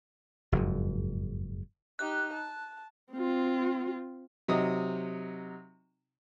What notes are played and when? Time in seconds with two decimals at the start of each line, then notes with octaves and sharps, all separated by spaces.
0.52 F#1 F2 G#2
1.99 D#4 G4 F#6
2.33 A5
3.13 C4 F4
4.48 C3 F#3 D#4 D#6